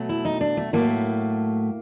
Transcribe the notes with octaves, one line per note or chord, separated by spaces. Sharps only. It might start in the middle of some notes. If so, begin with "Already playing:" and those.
Already playing: B2 F#3 A3
E4
D#4
D4
A3
A2 F#3 A3 A#3